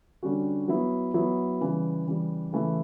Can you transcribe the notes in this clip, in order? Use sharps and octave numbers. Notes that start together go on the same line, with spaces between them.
D3 G3 C#4 F#4
F#3 B3 E4
F#3 B3 E4
C#3 E3 G3
C#3 E3 G3
C#3 E3 A3 E4